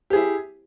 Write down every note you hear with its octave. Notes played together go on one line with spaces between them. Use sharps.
E4 G4 G#4